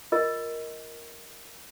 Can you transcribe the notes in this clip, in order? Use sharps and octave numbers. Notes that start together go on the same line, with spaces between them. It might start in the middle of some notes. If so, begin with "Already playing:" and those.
F4 A#4 D#5